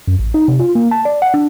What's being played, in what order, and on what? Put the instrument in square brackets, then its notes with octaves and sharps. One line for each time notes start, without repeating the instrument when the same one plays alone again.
[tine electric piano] F#2
A1
D#4
C3
F4
A#3
A5
D5
F#5
D4